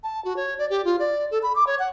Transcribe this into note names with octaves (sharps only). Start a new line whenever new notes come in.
A5
F#4
C#5
D5
G4
F4
D5
A4
B5
D6
C#5
F#5